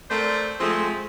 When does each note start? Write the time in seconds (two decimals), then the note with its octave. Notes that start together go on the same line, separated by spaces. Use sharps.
0.10 A3 C4 A#4 C5 D5
0.60 F3 G#3 A3 C4